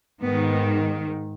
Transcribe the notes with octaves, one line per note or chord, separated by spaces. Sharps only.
G#2 D#3 B3